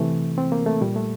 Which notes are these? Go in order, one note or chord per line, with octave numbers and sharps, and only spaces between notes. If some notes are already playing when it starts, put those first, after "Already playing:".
Already playing: C3 E3 A3
C4
A#3
A3
A#2 G3
A3